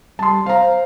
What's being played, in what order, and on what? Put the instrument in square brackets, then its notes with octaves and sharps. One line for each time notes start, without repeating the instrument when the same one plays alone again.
[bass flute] G3 [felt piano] A5 C6
[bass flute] C5 [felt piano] F5 A#5